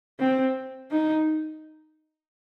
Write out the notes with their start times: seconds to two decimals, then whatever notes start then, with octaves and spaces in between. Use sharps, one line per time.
0.20 C4
0.91 D#4